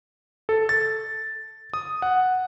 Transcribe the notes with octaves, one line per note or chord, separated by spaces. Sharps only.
A4
A6
D#6
F#5